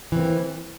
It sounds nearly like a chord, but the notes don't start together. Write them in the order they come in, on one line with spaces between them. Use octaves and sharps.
E3 C4 A#3